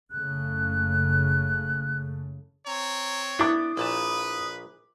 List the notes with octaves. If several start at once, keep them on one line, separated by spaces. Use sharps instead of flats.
F#1 C#3 A3 F#6
C4 C#5 A#5
B3 D4 E4 D6 D#6
A#1 A#2 B4 A5